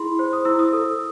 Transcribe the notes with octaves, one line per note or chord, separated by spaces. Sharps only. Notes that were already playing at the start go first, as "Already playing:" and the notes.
Already playing: E4 G#4 B5 C6
C5
D#6
E4 E6
D#6
A4